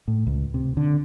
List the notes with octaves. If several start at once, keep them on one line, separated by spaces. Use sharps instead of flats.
A2
C#2
C3
D3